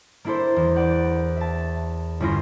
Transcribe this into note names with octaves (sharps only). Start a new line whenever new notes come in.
A#3 D4 E4 A4 C5
E2
D5 F#5 G6
E5 A5
G1 C#4 E4 F4 A#6